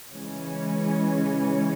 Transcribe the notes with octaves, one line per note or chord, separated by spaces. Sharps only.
C#3 E3 G#3 C#4